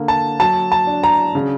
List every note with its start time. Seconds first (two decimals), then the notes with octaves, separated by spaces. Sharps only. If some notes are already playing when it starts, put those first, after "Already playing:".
Already playing: D3 A#3
0.08 A5
0.39 F#3 A5
0.72 A5
0.87 D4
1.03 A#5
1.35 C#3